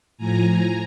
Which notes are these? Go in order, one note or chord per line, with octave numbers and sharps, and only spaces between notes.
A2 F3 G#5 A#5
G#5 A#5